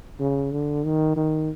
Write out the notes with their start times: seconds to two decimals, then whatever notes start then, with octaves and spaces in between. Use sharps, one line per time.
0.20 C#3
0.52 D3
0.85 D#3
1.16 D#3